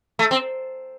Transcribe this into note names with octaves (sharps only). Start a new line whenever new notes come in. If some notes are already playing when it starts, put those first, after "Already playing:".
A3
C4